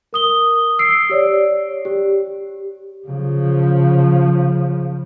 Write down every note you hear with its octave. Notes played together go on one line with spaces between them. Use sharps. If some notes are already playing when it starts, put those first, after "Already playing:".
A#4 D#6 G7
E6 C7 D7
G4 C#5 D5
G4
C#3 F3